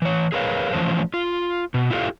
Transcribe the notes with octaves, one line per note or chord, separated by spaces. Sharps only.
E3 C#5
G#4 A#4 B4 C#5 F5
E3 F3 A3 C#4 A4 C5
F4
B2
E4 F4 G4 A4 F5